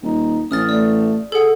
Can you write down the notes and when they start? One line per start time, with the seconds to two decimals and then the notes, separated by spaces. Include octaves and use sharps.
0.02 D#1 D#4
0.51 A1 C#4 D#6 F6 A6
0.69 A3 D5
1.32 G#4 A4 F#5